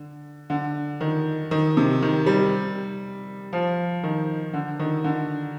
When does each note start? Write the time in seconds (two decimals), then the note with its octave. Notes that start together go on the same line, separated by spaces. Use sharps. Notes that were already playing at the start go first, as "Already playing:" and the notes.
Already playing: D3
0.50 D3
1.01 D#3
1.51 D#3
1.77 C3
2.02 D#3
2.26 G3
3.53 F3
4.04 D#3
4.53 D3
4.79 D#3
5.04 D3